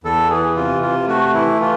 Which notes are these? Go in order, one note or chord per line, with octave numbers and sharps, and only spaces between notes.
E2 A4
E3 G#4
C3 F4
C3 F4
A3 F#4
E3 E4
E3 F4